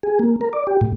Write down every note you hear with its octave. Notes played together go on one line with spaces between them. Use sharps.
G#4
A#3
A#4
D5
G4
A2